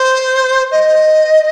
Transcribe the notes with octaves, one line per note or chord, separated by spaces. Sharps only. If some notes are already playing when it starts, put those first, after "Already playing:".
Already playing: C5
D#5